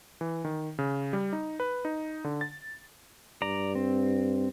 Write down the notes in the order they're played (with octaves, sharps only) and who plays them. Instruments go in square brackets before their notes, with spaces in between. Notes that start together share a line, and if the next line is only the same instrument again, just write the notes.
[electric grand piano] E3
D#3
C#3
G3
D#4
B4
D#4
D3
A6
[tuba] G2 [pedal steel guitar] D5 A#5
[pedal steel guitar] C4